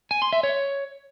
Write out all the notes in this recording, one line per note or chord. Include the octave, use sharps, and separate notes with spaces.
G#5
C6
E5
C#5